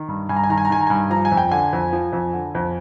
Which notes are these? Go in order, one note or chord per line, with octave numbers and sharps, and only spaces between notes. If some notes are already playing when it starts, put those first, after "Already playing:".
Already playing: D#3
G2
G2 G#5
A#5
G#5
D#3 A#5
G#5
A#5
D#3 G#5
A#5
G2 G#5
F3 A#5
G#5
F2
G5
D3 G#5
F2
F3
F2
D3
F2